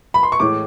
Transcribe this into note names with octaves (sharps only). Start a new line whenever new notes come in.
B5
C6
C#6
A2 E3 G#3 D6